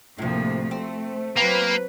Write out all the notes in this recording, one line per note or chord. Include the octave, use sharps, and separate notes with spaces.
D2 A2 C3 F3 A#3
A3 C4
F#3 A#3 C4 B4